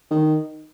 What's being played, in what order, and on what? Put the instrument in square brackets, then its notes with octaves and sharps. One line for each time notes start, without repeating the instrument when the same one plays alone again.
[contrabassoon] D#3